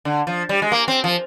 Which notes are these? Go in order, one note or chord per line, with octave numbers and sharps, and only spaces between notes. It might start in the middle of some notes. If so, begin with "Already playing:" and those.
D3
F3
G3
G#3
A#3
C4
F3